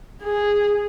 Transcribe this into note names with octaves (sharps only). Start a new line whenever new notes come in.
G#4